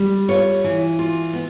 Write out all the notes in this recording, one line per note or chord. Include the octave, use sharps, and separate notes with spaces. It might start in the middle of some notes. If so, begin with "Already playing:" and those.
Already playing: G3
F4 C#5
E3
F4
B3